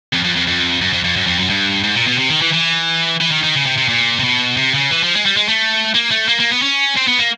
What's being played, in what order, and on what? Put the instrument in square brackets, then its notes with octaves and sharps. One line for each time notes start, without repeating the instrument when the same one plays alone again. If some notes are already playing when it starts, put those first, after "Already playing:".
[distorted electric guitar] F2
F2
F2
F2
F#2
F2
F2
F#2
F2
F#2
G2
G#2
A#2
B2
C3
D#3
E3
E3
E3
D#3
D#3
C#3
C3
C3
A#2
C3
B2
C3
C#3
E3
F3
G#3
G3
G#3
A3
A#3
A3
A#3
A#3
B3
C#4
C4
B3
A#3